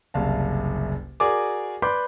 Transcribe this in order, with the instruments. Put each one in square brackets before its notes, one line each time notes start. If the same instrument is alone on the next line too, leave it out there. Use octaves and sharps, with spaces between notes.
[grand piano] F#1 C2 F5 A5
F#4 G#4 A#4 D5 G#5 D6
B4 D5 B5 C6 D6 G6